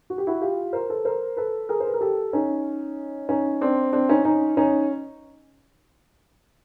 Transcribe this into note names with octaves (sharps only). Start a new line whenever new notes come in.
F#4
G4
E4 F#4
F4 G4
A#4 C5
A4 B4
A#4 C5
A4 B4
G#4 A#4
C5
B4
A#4
G4 A4
C#4 D#4
C#4 D#4
C4 D4
C4 D4
C#4 D#4
C#4 D#4
C#4 D#4